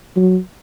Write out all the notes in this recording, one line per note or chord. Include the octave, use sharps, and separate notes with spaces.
F#3